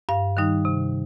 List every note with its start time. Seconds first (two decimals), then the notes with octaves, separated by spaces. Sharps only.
0.09 G2 F5
0.37 D#3 G3 D#4
0.65 C3